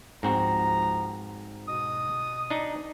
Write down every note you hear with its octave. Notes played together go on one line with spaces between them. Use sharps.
C#2 G#2 F3 C4 F#4 A#5
B2 D#5 D#6
D4 D#4